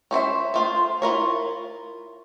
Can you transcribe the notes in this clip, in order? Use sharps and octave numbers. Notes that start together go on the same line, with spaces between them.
C#4 C5 C#5 E5
A3 F4 C5
E4 F4 A#4 C#5